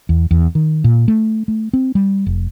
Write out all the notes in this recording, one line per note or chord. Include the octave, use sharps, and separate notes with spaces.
E2
E2
D#3
A#2
A3
A3
C4
G3
F1